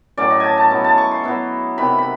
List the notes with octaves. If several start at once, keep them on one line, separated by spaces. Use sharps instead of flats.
A2 F#3 A3 C#4 D5
D#5
G#5 A5
A5
F#3 B3 E4
A5
C#6
C6
F#3 B3 E4
C3 D#3 F#3 B3 B5
B5